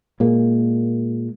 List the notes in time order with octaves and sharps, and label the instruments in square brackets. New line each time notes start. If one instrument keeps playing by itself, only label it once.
[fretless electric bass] A#2 G#3 A#3